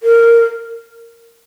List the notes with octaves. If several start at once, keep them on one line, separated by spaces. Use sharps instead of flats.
A#4